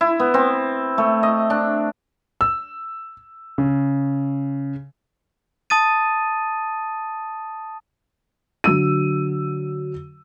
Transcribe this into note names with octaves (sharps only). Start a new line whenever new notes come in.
E4
B3
C4
A3
D#5
D4
E6
C#3
A5 D#6 A6 D#7
D3 F#3 E6 D#7